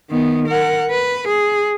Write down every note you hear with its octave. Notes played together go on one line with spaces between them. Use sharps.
D#3 B3
A#4 F#5
B4
G#4